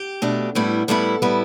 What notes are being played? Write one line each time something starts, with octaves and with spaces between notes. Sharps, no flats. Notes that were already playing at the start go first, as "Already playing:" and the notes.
Already playing: G4
B2 A3 D4
A2 G3 B3 E4
A2 G3 B3 E4 A4
A2 G3 B3 E4